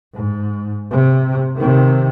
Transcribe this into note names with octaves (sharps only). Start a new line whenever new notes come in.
G#2
C3
C3 D#3